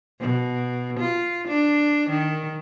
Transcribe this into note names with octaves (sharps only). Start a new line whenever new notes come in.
B2
F4
D4
D#3